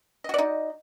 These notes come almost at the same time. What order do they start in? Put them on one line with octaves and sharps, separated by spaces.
D#5 F#4 D5 D#4